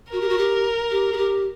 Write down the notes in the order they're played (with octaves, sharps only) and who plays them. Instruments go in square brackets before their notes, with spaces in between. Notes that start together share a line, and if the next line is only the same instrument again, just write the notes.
[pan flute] F#4 [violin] A#4
[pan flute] G4
F#4
G4
G4
G#4
G4